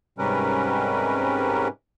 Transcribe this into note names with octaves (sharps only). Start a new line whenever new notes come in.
G#2 C3 G3 C#4 A#4 B4